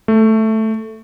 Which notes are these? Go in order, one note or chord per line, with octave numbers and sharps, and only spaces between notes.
A3